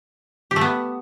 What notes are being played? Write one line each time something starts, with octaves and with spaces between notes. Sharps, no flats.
G4
A3
B3